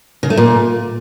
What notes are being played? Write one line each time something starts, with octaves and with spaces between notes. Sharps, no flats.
C#3
A3
A#2